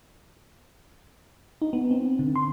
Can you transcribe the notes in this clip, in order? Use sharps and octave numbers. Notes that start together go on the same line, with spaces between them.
D#4
B3
C4
D3
C6